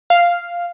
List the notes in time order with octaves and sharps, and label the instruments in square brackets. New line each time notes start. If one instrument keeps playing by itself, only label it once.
[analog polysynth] F5